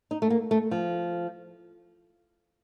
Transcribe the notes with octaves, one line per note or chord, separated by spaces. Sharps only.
D#4
A3
A#3
A3
F3